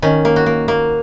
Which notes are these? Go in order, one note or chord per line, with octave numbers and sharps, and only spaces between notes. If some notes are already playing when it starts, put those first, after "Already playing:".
D#3 C#4
A#3
F#4
A#3
A#3